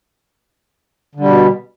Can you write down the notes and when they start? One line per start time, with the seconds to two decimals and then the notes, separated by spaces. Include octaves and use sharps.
1.15 D3
1.20 G3
1.25 B2